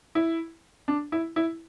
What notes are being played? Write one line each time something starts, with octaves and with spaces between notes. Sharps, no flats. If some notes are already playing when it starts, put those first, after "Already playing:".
E4
D4
E4
E4